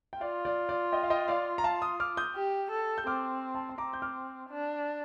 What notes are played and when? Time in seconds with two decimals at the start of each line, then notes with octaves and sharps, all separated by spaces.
0.13 G5
0.21 F4 D5 F5
0.45 D5
0.69 D5
0.92 D#5 G5
1.03 F5
1.10 D#5 G5
1.28 D5 F5
1.58 A#5
1.64 F5 A5
1.82 C6 D#6
2.00 D6 F6
2.17 D#6 G6
2.36 G4
2.71 A4
2.98 G6
3.07 C4 D6 F6
3.55 A5 C6
3.69 C6
3.78 C4 A#5 D6
3.93 G6
4.02 D6 F6
4.49 D4